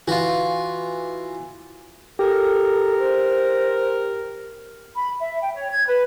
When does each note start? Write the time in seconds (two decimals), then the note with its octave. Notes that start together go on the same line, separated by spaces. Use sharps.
0.08 E3 F4 F#4
2.19 G4 A4 A#4
2.99 C5
4.95 B5
5.20 E5
5.40 G5
5.53 C#5
5.71 G#6
5.87 B4